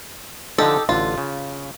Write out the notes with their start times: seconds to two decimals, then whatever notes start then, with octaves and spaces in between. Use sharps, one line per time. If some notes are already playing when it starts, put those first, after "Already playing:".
0.58 D3 F3 D#4 G4 A4
0.89 A1 D3 F4
1.18 C#3